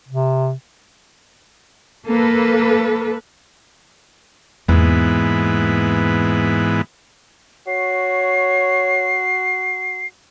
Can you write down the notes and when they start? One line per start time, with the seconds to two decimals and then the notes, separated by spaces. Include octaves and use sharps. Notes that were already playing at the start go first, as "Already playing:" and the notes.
0.09 C3
2.06 A#3 A4 B4
4.69 E2 G#2 E3 A#3 B3
7.68 F#4 C#5 C7